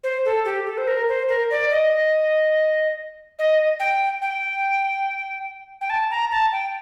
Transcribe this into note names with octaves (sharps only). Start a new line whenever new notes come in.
C5
A4
G4
A4
C5
A#4
C5
A#4
D5
D#5
D#5
G5
G5
G5
A5
A#5
A5
G5